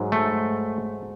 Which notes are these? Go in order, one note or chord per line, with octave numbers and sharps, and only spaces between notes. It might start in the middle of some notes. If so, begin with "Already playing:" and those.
Already playing: G#2 F#3
A3